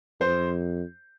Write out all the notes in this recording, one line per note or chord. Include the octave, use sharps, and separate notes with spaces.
F2 C5